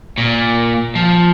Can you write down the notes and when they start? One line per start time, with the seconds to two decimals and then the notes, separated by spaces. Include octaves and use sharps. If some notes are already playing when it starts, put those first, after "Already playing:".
0.18 A#2
0.95 F3